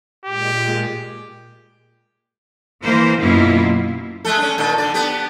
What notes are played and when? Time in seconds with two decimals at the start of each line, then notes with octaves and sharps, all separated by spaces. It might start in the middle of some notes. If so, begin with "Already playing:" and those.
0.25 A#2 G#3 G4
2.83 E3 A#3 A#4 C5
3.19 F#2 B2 A#3 E4 F4
4.25 G#3 A3 A4
4.38 C#4 D4
4.58 A#2 D#3 A4
4.78 D3 D5
4.94 B3 G4